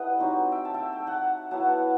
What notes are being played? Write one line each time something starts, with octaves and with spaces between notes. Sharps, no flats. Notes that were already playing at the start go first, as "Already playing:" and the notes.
Already playing: G3 B3 E4 A4 B4 D#5 F#5
F#3 C4 D#4
E5 G5
A5
E5 G5
A5
G5
F#5 A5
F#3 B3 E4 F#5 A5